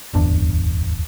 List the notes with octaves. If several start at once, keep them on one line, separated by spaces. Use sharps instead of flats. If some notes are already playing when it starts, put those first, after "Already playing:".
D1 G1 E2 D4